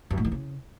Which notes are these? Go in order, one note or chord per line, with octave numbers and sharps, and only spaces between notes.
F#2
A2
D#3
C#3